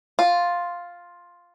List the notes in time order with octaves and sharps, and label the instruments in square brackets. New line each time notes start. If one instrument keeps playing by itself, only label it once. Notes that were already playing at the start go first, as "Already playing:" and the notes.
[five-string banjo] F4